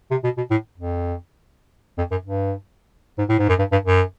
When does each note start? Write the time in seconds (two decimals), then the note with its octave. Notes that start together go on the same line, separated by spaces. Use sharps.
0.11 C3
0.24 B2
0.37 B2
0.51 A2
0.78 F2
1.98 F2
2.11 F#2
2.25 G2
3.18 G#2
3.29 A2
3.39 G#2
3.49 F#2
3.59 G2
3.72 G2
3.85 F#2